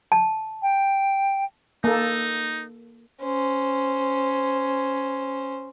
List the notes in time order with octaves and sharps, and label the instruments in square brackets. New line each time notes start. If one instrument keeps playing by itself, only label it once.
[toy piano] A5
[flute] G5
[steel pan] A#3 A4 [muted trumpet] D#4
[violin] C#4 C5